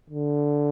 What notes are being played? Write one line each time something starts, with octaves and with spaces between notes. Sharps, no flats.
D3